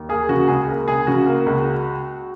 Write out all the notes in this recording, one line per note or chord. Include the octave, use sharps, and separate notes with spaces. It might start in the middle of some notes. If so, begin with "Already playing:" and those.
Already playing: D#2
A#3 G#4
C#3 F#4
C#2 G#4
A#3
C#2 G#4
C#3 F#4
A#3
C#2